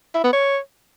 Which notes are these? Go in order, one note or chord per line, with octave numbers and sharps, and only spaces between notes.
E4
B3
C#5